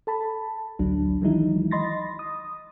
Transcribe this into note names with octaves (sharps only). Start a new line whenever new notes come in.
A4 A5 B5
A1 D2 F#3 D4
D#3 E3 F#3 G#3 D#4 E4
D#5 B5 C6 A6 A#6
D#6